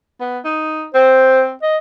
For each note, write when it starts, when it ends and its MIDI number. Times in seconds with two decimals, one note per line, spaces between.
0.21 0.39 59
0.44 0.85 63
0.94 1.52 60
0.94 1.42 72
1.62 1.78 75